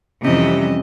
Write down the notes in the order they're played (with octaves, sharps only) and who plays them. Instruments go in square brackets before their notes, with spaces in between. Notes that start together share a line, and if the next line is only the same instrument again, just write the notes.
[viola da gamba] F2 E3 D#5 [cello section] C3 G3 [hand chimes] C#4